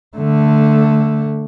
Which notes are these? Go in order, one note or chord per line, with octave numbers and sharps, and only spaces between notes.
D3 A3